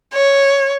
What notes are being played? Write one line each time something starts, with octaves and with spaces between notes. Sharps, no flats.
C#5